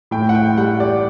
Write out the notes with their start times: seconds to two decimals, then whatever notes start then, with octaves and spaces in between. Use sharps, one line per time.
0.11 A2 G5
0.29 F#5
0.35 G5
0.57 G3 F#5
0.80 D5